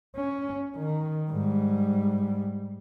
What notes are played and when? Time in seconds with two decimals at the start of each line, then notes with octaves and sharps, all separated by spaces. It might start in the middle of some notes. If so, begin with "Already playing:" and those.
0.16 C#4
0.77 D#3
1.30 G#2 G3